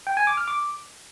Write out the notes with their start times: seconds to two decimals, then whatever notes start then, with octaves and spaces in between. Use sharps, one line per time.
0.07 G5
0.17 G#5
0.27 D6
0.37 F6
0.48 D6